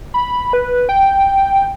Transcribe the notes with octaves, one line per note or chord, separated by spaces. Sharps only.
B5
B4
G5